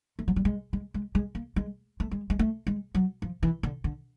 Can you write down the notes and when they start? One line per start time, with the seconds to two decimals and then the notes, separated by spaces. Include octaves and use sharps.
0.19 A3
0.28 F#3
0.36 G3
0.45 G#3
0.73 G#3
0.94 G#3
1.15 G#3
1.35 A#3
1.56 G#3
2.00 A3
2.11 G#3
2.30 G#3
2.39 A3
2.67 G#3
2.95 F#3
3.22 F3
3.43 E3
3.63 D3
3.84 D3